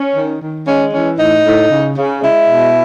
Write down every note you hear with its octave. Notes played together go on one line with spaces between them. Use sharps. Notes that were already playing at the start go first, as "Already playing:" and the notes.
Already playing: C#4
D#3
D#3
G#3 C#4
E3 C#4
A2 D#4
A2
C#3
C#3
G#3 E4
B2